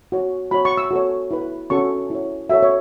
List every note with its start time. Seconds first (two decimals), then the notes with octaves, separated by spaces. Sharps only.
0.12 F#4 C#5
0.51 F#4 C#5 B5
0.65 C#6
0.77 E6
0.91 F#4 A4 C#5
1.31 E4 B4
1.70 C#4 F#4 A4 C#5 C#6
2.10 E4 C#5
2.49 F#4 A4 C#5 E5
2.62 C#5